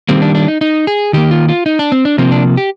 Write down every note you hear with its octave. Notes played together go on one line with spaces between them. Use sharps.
D#3 G3 A#3 C4
D4
D4
D#4
D#4
G#4
D#3 A#3 G4
F4
F4
D#4
D4
C4
D4
C3 F3 A#3 C4
D4
G4